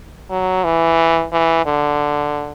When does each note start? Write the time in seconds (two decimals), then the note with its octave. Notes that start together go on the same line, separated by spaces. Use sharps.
0.30 F#3
0.64 E3
1.33 E3
1.66 D3